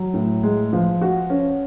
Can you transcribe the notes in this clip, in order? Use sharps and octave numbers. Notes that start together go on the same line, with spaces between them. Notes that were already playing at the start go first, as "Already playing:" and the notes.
Already playing: F#3
A2
G#3
F3
F#4
C#4